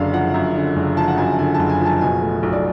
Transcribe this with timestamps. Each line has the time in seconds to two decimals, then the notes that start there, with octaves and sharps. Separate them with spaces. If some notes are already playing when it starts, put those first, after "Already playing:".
Already playing: F#1 F#2 D3 D5 F5
0.13 F3 F#5
0.34 F#2
0.55 D3
0.76 F#1
0.97 F3 A5
1.08 F#5
1.18 F#2 G#5
1.39 D3 G#5
1.54 F#1 A5
1.69 G#5
1.80 F3
1.85 A5
2.01 B2 G#5
2.22 A3
2.43 B1
2.53 D5